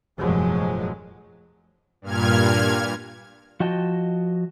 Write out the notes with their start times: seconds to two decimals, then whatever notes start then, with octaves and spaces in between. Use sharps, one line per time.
0.18 F1 G2 A#2 F3 F#3 G#3
2.02 G2 A#2 F6 G#6
3.60 F3 F#4 D#5 G5 A5